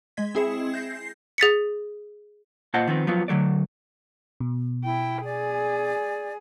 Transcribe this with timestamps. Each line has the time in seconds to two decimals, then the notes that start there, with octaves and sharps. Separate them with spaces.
0.17 G#3 D#5 G#6 B6
0.35 C4 E4 G#4 E5 C#7 E7
0.74 G6 A#6 C7
1.38 G#4 A6 B6 C#7
2.74 A#2 F4 C5 D#5 F#5 A5
2.87 D#3 F3 B3 C4
3.07 F3 F#3 B3 F4
3.28 D3 F#3 A3 D5
4.40 B2
4.85 E4 G5
5.24 G#4 D5 G#5